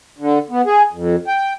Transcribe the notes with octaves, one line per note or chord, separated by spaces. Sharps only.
D3
B3
G#4
F2
G5